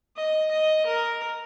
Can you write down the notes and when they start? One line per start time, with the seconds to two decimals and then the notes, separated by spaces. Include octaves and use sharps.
0.17 D#5
0.51 D#5
0.87 A#4